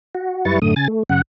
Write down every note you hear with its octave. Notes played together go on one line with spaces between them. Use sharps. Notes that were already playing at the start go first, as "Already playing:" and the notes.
F#4
F#2 G3 E4 B4 C#6 A6
F#2 A2 D3 A3 D#6
C#3 G#5 A6
A3
F#2 C#3 F#5